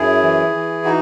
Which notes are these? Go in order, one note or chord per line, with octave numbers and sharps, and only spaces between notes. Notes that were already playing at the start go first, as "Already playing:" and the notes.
Already playing: F#2 E4 G#4
E3
E3
D#4 F#4